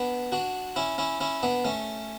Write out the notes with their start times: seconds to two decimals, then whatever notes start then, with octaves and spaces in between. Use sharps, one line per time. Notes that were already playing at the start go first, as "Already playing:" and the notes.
Already playing: B3 D4
0.32 D4 F#4
0.76 C#4 E4
0.98 C#4 E4
1.20 C#4 E4
1.43 B3 D4
1.65 A3 C#4